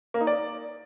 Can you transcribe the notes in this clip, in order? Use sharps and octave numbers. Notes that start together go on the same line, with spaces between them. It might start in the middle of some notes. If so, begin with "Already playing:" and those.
A#3
D#4
D5